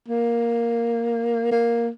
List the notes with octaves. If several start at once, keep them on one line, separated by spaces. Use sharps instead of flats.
A#3
A#3